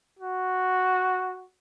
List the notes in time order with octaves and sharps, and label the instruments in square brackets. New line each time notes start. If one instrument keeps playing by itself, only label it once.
[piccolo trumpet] F#4